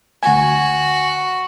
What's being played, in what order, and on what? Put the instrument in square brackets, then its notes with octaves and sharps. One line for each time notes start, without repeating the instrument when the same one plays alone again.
[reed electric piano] D2 G#5 [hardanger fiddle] F#4